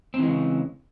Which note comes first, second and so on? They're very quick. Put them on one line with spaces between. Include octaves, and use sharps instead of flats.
C4 E3 G#3 C#3